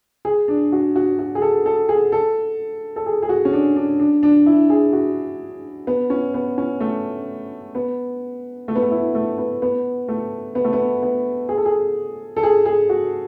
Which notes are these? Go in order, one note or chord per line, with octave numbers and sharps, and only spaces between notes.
G#4
D4
F#4
F#4
F#4
G#4
A4
A4
G#4
A4
A4
G#4
G#4
F#4
C#4
D4
D4
D4
D4
E4
G#4
F#4
B3
C#4
B3
C#4
A3
B3
A3
B3
A3
E4
A3
B3
B3
A3
B3
A3
B3
B3
G#4
A4
G#4
A4
G#4
G#4
F#4